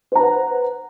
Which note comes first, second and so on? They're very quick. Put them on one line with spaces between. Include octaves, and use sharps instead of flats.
C5 A#5 B4 F#5